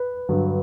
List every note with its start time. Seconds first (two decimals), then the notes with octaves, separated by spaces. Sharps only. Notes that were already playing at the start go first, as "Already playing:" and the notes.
Already playing: B4
0.29 G2 D3 F#3